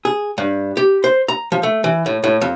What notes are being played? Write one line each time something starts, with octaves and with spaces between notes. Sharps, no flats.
G#4
G2
G4
C5
A#5
F3
A3
E3
A2
A2
F2